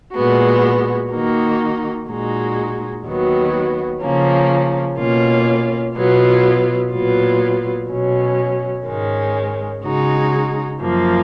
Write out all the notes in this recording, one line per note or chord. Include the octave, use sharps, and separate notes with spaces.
A#2 G#3 B3 F#4
D#3 A#3 D#4 F#4
A#2 G#3 D#4 F#4
D#2 D#3 F#3 B3 F#4
C#3 F3 A#3 C#4
B2 A#3 C#4 F4
B2 F#3 B3 F4
A#2 F#3 B3 F4
B2 F#3 C#4
G#2 D#3 G#3 C#4
C#3 G#3 D#4 F#4
F#2 F3 A#3